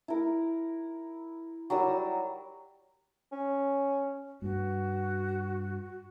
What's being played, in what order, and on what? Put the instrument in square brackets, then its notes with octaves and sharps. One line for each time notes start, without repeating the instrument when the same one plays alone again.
[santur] E4 A#4
F#3 G3 A#4 E6
[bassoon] C#4
[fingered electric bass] G2 [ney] F#4